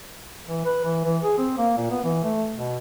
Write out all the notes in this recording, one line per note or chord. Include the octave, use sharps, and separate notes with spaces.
E3
B4
E3
E3
G#4
C4
A#3
A#2
B3
E3
A3
B2